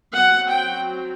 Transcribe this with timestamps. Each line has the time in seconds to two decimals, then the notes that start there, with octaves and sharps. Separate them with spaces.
0.16 F#3 C4 F#5
0.52 G5